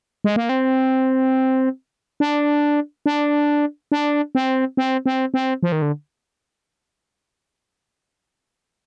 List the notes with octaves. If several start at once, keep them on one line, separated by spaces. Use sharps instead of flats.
G#3
A#3
C4
D4
D4
D4
C4
C4
C4
C4
F3
D#3
D3